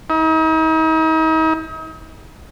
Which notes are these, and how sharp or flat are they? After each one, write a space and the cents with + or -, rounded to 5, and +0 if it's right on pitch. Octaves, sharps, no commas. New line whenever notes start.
D#4 +40